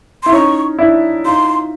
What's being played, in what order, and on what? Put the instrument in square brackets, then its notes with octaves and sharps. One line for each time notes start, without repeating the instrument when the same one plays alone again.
[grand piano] E4 [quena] C6
[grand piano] C#4 D#4 [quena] C#6
[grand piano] D4 E4
[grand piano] D#4 F4 [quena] C6